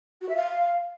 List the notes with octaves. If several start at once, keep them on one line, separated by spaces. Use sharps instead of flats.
F#4
E5
F5